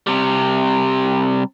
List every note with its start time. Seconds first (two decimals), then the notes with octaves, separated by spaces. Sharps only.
0.07 C3 G3